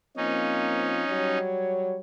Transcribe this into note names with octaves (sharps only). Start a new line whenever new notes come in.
F3 A#3 C4 C#4 D#4
F#3 G3 C#5